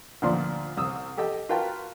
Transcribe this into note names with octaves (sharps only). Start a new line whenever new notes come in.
D2 A#2 F3 D4 C6
C2 D#6 E6
G4 A4 D#5 G5
F4 F#4 A#4 B4 G5 A5